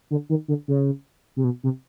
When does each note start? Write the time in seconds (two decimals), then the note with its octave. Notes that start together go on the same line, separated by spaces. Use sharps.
0.11 D3
0.29 D#3
0.48 D3
0.68 C#3
1.36 C3
1.44 B2
1.64 C3